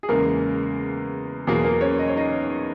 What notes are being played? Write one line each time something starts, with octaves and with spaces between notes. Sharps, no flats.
G#4
E2 C#3 G#3 A#3 A#4
E2 B2 F#3 A#3 G#4
A#3 A#4
C#4 C#5
D#5
C#5
D#4 D#5